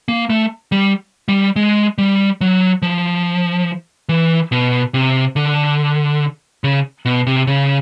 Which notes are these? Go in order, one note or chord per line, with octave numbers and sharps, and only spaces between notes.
A#3
A3
G3
G3
G#3
G3
F#3
F3
E3
B2
C3
D3
C#3
B2
C3
C#3